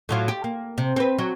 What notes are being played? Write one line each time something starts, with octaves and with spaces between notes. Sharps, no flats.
A2 F#3 F4
G4
A#3
C3
C4 B4
F#3